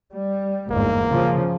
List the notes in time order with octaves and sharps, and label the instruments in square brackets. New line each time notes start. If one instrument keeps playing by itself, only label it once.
[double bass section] G3
[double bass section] G1 E2 G#2 [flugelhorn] A#3
[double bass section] C#3 F3